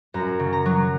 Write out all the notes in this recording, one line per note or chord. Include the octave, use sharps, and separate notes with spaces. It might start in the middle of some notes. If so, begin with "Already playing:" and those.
F#2 A#5
C#3
A#5
F#3